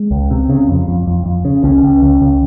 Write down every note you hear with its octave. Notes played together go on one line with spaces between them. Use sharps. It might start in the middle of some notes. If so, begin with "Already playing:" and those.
Already playing: G#3
C#2
C3
C#3
F2
F2
F2
F2
C#3
C#2 C#4
C#2
C#2
C#2